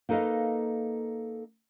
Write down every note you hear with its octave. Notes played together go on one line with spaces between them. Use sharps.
A#3 D#4 A4 B4 D#5 F5